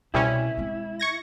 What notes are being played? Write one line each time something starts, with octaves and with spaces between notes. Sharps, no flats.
C2 B2 G3 C#4 E4
G#3 C4
C#6 G#6 A#6